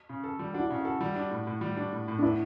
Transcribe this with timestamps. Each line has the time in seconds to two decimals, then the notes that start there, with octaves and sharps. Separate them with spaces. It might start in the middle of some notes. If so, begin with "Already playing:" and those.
0.09 C#3
0.24 A4
0.39 G3
0.53 D4 F#4
0.60 E4
0.70 C#3
0.80 F#4 A4
1.01 G3
1.16 D4
1.31 A2
1.47 A2
1.61 G3
1.77 D4
1.92 A2
2.08 A2
2.19 D4
2.22 B3 E4